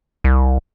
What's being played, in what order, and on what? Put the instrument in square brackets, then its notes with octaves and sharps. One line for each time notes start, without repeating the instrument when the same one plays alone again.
[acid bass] C2